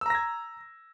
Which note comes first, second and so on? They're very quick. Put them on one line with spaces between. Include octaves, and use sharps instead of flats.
E6 A#5 A#6 G#6